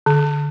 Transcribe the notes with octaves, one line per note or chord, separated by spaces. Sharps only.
D3